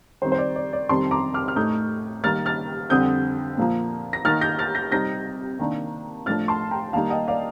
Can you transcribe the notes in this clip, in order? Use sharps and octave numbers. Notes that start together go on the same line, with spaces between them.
D#3 G3 C4 C5
C5
D5
D5
D5
F2 C3 D#3 G3 C4 A5 C6
A#5 D6
D6 F6
F6
A2 A3 D#4 D#6 G6
D#3 G3 A#3 D#4 F6 A6
F6 A6
F2 D3 G3 C4 D#6 G6
A#2 F3 A#3
A#6
D#3 A#3 D#4 F6 A6
G6 A#6
F6 A6
G6 A#6
C3 G3 C4 D#4 G6 A#6
C3 D#3 A#3 D4
A2 F3 A3 D4 F6 A6
A5 C6
G5 A#5
D#3 G3 A#3 D#4 F5 A5
D#5 G5
D5 F5